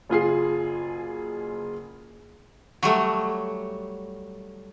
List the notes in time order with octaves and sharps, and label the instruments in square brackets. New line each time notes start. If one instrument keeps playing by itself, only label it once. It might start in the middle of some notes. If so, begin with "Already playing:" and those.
[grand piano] F#1 F4 G#4 C7
[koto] F#3 G3 A3